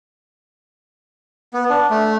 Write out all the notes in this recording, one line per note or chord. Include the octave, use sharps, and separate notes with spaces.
B3
D4
A3